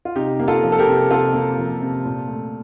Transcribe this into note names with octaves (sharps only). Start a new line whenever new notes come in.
F4
C3 D#4 G4
A#3
F4 A4
F3
A4
G4 A#4
C3
C3 F4 A4
A#3
F3
C3
A#2
A3